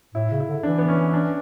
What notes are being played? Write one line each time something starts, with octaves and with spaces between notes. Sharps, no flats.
A2 E4
C#3
E4
D3
E3 D4
B3
C#4
D4